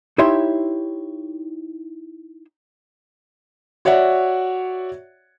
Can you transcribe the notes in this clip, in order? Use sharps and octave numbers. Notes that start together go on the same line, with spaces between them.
D#4 E4 G4 C#5 E5 C6
F#4 C#5 D5 E5 F#5